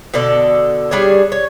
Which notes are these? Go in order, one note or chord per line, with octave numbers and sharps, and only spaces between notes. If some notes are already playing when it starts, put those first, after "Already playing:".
B2 D3 A4 D5
G3 D4 G#4 C#5
C#5